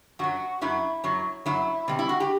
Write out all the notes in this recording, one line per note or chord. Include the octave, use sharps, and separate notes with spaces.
F#2 F#3 F#4
F#2 F#3 E4
F#2 F#3
F#2 F#3 E4
B2 G3 C4
E4
F#4
G4